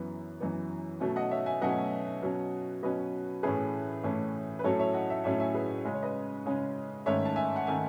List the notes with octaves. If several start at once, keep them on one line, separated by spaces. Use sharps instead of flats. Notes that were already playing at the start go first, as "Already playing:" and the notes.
Already playing: F#2 E3 B3
F#2 E3 B3
B2 F#3 A3 C#4
D#5 F#5
C#5 E5
E5 G#5
B2 F#3 A3 C#4 D#5 F#5
B2 F#3 C#4
B2 F#3 C#4 B4 D#5
A2 E3 A3 C#4 G#4 B4
A2 E3 A3 C#4
B4
A2 F#3 A3 C#4 A4 C#5
C#5 E5
D#5 F#5
C#5 E5
A2 F#3 A3 C#4 C#5 E5
E5 G#5
G#4 B4
C#3 G#3 C#4 D#5
C#5
B4 D#5
C#3 G#3 C#4
G#2 D#3 A3 C#4 C#5 E5
A5
E5 G#5
F#5
D#3 A3 C#4 E5 G#5